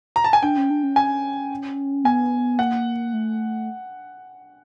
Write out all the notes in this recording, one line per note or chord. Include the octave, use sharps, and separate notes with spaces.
A#5
A5
G#5
D4 G5
C#4
D4
C#4
G#5
B3 G#5
A#3 F#5
A3